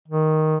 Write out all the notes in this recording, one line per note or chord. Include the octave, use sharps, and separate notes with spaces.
D#3